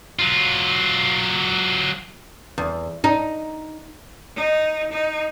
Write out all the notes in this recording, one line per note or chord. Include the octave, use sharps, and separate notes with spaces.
F#3 F4
E2
D#4
D#4
D#4